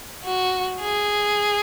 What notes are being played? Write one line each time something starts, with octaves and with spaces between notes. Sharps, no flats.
F#4
G#4